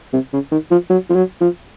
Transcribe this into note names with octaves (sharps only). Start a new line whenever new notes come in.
C3
C#3
D#3
F3
F#3
F3
F#3
F3